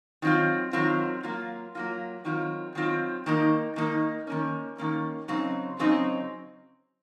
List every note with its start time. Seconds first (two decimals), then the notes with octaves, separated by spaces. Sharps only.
0.22 D#3 F#3 C4 F4
0.73 D#3 F#3 C4 F4
1.23 F#3 A#3 F4
1.75 F#3 A#3 F4
2.25 D#3 F#3 C4 F4
2.75 D#3 F#3 C4 F4
3.26 D#3 A#3 D#4
3.76 D#3 A#3 D#4
4.27 D#3 A#3 C#4
4.78 D#3 A#3 C#4
5.28 C#3 F#3 C4 D#4
5.79 C#3 F#3 C4 D#4